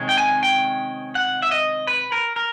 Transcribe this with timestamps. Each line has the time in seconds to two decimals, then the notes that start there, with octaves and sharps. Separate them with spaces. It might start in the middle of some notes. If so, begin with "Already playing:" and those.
Already playing: C3 D#3 G#3 C#4
0.09 G5
0.18 G#5
0.43 G5
1.15 F#5
1.42 E5
1.51 D#5
1.87 B4
2.12 A#4
2.36 A#4